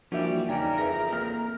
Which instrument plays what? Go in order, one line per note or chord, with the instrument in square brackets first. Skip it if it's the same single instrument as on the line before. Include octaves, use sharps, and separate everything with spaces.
[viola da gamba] E3 G3 [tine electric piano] F3 D4 F#4 [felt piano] A#3 E5
[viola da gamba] E2 C#3 [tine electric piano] D#4 D5 G#5 [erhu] A#4 [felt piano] G5
[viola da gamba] F2 [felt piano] G#4 B4 E5 [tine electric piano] A#6
[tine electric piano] A#3 [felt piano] F6